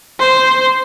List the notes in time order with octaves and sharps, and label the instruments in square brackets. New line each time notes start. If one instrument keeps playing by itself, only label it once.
[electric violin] C5